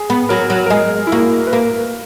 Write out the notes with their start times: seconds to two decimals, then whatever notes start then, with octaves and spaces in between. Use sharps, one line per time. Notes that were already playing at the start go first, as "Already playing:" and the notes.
Already playing: G#4
0.10 B3
0.29 F#3 A#4
0.50 F#3
0.66 A#4
0.70 G#3 G#4
1.07 E4
1.12 A#3 F#4
1.47 B4
1.53 A#3 A#4